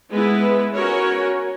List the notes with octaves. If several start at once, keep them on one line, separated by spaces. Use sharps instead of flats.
G#3 B3 E4 B4
C#4 F#4 A#4 C#5